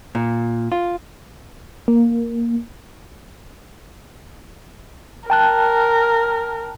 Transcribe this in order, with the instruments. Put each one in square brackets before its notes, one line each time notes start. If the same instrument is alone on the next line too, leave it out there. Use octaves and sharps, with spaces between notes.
[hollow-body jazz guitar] A#2
F4
[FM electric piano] A#3
[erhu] A#4 [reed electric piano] G5 A5 F#6